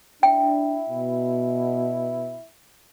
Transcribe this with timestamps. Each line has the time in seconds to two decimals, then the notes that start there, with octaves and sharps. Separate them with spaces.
0.23 D4 E4 G5
0.90 B2